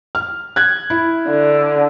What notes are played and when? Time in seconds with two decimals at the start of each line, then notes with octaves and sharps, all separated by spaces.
0.15 F6
0.56 F#6 G#6
0.90 E4
1.29 D3